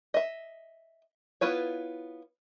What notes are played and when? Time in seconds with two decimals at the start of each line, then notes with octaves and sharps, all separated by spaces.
0.14 D#5 E5
1.41 B3 E4 F4 B4 C#5